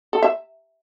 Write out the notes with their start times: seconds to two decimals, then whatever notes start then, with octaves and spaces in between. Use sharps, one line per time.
0.13 A4
0.22 E5